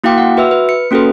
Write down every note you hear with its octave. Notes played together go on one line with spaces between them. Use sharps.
A#3 E4 F#4 F5 G5 D6
F#5
F#4 B4 E5 E6
B4
C#7
A#3 C#4 F#4 A4 B4